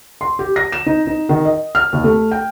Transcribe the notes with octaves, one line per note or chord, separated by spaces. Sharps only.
C6
G4
A#6
E7
D#4
D#4
D#3
D#5
F6
D#2
A3
G5